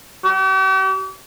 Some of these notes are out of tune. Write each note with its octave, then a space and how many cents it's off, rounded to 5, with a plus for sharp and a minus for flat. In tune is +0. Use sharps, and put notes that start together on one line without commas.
G4 -45